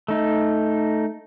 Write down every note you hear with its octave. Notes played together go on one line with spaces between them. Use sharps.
A3 D#4